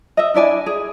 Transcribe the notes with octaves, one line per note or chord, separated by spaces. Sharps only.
D#5 E5
D4 E4 D5 G#5
G#4